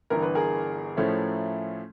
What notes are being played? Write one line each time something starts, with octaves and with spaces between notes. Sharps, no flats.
G1 G2 E3 A#4
B4
G#4 A#4
A2 F3 A3 C#4 E4